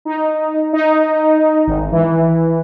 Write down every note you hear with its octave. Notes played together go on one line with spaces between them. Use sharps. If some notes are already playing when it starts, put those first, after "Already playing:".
D#4
D#4
G#1
E3